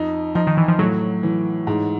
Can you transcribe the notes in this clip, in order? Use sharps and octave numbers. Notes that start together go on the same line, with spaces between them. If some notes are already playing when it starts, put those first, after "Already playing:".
Already playing: F2 D#4
F3 D#4
D#3
E3
F3
A2 F#3
E3
G#2